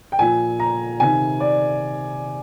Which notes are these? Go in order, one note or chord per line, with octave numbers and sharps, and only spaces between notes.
G5
A#2 F3 G#5
A#5
C3 D#3 G#5
D5